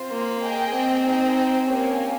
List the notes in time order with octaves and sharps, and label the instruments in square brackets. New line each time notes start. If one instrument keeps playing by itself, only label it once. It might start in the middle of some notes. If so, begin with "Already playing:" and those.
Already playing: [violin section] C4 F4 C5
[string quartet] A#3
[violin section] G#4 D#5 G5
[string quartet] C4
[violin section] D#4 G#4 D#5 G5
A#3 C#4 G4 C#5 G#5